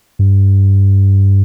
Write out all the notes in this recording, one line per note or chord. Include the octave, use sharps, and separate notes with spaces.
G2